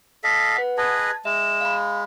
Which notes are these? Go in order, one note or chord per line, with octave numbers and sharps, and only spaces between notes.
A4 D#5 F5 B6
B4 F#5
G#4 B4 D#5 A5 G#6
G#3 E5 E7
F5 B5